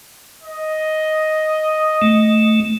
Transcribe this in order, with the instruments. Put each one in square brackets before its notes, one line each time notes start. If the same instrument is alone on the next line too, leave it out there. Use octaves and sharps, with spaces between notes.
[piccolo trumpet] D#5
[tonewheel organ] A3